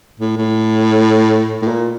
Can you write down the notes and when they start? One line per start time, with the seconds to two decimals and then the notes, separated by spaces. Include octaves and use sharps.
0.20 A2
0.37 A2
1.62 A2
1.68 A#2